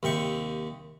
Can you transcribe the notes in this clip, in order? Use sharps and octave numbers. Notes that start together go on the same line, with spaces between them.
D#2 C3 G5 C#6